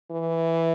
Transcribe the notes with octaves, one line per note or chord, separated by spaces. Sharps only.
E3